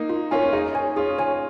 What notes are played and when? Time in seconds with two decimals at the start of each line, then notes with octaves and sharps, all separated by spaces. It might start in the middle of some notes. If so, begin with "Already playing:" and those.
Already playing: A#3 D#4
0.10 F4
0.31 C#4 F4 A#4 C#5 G#5
0.53 A#3 D#4 G#4
0.75 C#5 G#5
0.96 C#4 F4 G#4
1.18 C#5 G#5